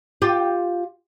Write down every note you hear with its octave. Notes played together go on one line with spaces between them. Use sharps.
F4 G4